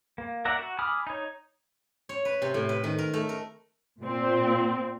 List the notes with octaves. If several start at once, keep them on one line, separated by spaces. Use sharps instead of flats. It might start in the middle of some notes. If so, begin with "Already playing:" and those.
A#3
A#4 D5 E5 F#5 A#5
F#4
G#5 B5 D6 D#6 F6
D#4 C#5
C#5
B4
C3
A2
B4
D#3
A#4
A3
A#4
A#2 C4